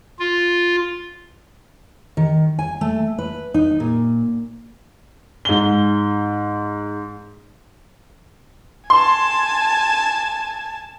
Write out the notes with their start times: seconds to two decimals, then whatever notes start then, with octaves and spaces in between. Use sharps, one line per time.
0.19 F4
2.17 D#3
2.59 G#5
2.81 A3
3.19 B4
3.54 D#4
3.80 A#2
5.45 G#2 G7
8.90 G#5 A5 C6